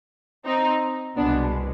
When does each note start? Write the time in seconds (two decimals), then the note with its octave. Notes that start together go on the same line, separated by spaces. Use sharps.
0.45 C4 D#4
1.16 C2 B2 G#3 B3 D4